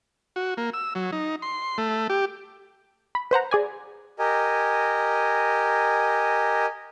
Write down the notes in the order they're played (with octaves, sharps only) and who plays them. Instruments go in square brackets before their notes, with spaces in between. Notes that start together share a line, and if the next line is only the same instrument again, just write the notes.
[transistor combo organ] F#4
A#3
E6
F#3
D#4
C6
A3
G4
[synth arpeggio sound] B5
B4 C5 F#5 A#5
G#4 D5 G#5
[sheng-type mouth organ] G4 A#4 D#5 G#5